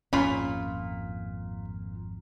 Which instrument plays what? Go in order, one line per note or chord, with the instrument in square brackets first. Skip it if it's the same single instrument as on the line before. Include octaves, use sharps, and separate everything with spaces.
[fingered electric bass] G#1 F2 [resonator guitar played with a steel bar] A#2 [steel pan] C#4 [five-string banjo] F4 B5